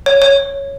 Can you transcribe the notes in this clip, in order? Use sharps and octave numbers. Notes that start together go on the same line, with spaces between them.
C#5
C#5